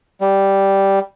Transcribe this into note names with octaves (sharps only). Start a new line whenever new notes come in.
G3